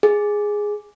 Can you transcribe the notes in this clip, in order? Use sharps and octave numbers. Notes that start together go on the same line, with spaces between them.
G#4